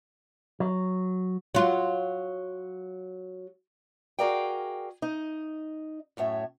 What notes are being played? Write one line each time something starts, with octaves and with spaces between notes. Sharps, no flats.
F#3
F#3 F4
F#4 G#4 A#4 D5 F5 G5
D#4 D#5
F#2 A2 C#5 E5